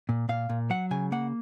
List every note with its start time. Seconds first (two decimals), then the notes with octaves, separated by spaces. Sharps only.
0.09 A#2
0.29 A#2 F5
0.49 A#2
0.70 F#3 F#5
0.91 C#3 G#5
1.12 A#3 F#5